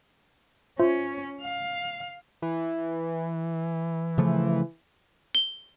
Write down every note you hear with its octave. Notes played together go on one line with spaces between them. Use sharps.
C#4 F4 C5 E5
F5
E3
C#3 F3 A3
G7